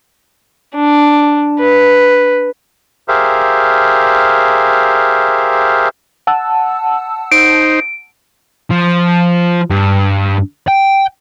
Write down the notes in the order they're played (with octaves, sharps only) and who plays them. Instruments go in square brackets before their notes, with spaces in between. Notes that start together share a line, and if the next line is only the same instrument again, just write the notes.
[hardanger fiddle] D4
B4
[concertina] G4 G#4 A#4 C5 E5 F5
[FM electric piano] F#5 A5 E6
[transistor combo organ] D#4 C5 [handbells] D7
[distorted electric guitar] F3
G2
G5